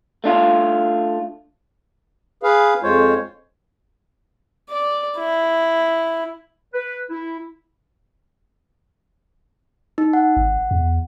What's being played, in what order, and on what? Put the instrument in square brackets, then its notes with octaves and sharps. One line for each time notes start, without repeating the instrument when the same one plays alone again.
[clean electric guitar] A3 D4 F4
[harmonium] G#4 B4 F5
F2 G#3 F4 C5 C#5
[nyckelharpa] D5
E4
[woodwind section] B4
E4
[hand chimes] D#4
F#5
[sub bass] G#1
E2